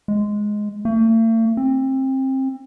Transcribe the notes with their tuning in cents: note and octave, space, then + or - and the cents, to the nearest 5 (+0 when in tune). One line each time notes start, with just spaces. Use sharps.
G#3 +5
A3 +45
C4 +25